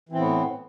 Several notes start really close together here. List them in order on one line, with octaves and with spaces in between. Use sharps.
E3 C4 A2 B3